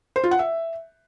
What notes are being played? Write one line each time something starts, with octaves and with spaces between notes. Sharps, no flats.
C5
F4
F#5
E5